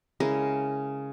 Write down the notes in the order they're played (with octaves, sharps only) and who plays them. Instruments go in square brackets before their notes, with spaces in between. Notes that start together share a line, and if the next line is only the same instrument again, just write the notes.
[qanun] C#3 G#3 E4 A#4